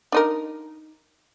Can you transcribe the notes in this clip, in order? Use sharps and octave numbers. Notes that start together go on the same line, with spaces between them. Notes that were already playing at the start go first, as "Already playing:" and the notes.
D4 D#4 A#4